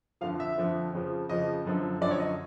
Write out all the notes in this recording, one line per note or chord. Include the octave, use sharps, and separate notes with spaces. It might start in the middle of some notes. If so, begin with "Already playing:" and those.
F2 D3 F3 F5
E5
F2 D3 F3
F2 C#3 F3
F2 C#3 F3 D#5
F#2 D3 F3
F#2 D3 F3 D5
C#5
D#5